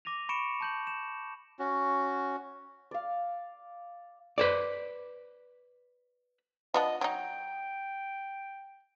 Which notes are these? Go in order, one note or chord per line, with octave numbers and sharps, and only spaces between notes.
D6 A#6 D#7 F7
B5 C#6 C#7 D7 E7
A5 G6 F#7
E7
C#4 F#4
D5 F5
B4 C5 D5
F3 B3 D4 D#5
F#3 D#4 G5